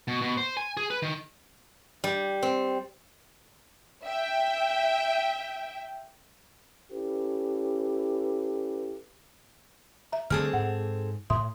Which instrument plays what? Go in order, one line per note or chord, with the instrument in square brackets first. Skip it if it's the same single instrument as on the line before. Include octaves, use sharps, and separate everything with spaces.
[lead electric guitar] B2
B2
C5
G#5
G#4
B4
D#3
[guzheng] G3
C4
[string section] E5 G5
[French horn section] C#4 E4 G4 A4 B4
[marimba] E5 A#5
[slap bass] D3 G3 A3 [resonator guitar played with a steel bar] C4 G#4 A4 [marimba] F6
[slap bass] G#2 [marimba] F#5
[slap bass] A2 [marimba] E5 C6 D#6